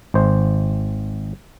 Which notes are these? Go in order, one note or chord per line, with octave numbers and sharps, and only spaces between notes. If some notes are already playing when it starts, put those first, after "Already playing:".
G#1 C5